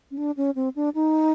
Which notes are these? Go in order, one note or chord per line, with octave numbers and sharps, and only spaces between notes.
C#4
D4
C#4
C4
D4
D#4